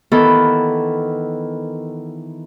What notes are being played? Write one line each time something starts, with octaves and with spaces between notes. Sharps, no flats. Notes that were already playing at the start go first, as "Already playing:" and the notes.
D#3 E3 B3 A4